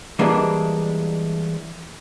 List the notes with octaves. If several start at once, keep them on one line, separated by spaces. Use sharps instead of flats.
E3 G3 G#3 A#3 D4